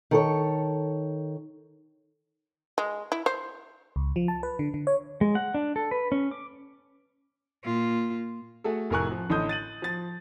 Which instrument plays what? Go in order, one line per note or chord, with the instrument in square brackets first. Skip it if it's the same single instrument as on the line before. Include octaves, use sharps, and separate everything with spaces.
[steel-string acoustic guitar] D#3 A4 C#5
[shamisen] G#3
E4
C5
[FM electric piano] C#2
F3
A5
B4
D3
D3
C#5
[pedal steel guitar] G#3
F#5
D4
A4
B4
C#4
D6
[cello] A#2 F4
[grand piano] A3 F#4 G#4 A4
F1 A2 A#4 G#5 C#6 F#6
F3
A1 D3 A4 D#5 D#6 G6
A6 D#7 F#7
F3 A6